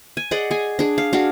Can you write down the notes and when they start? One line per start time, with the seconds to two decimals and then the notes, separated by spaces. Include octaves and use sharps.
0.17 G#5
0.31 G#4 D5 D#5 F#5
0.51 G#4 G#5
0.79 D4 G#4
0.98 F5
1.13 D4 F#4 G#4 F5